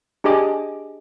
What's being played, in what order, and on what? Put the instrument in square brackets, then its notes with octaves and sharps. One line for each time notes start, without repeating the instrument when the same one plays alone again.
[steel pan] D4 G4 G#4 D#5 D6